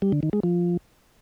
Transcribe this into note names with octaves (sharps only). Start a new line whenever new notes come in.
G3
D3
D#3
G#3
F3